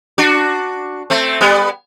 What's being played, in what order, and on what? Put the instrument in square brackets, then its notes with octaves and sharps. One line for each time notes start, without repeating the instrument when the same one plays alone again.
[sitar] D4 F#4
A3 C4
G3 B3